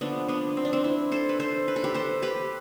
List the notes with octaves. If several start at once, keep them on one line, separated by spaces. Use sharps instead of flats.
D3 F3 A3 B3 D4
B3 D4
C4
D4
C4
C4 E4
A4 C5
B4
A4 C5
B4
A4
G4 B4
A4 C5
G4 B4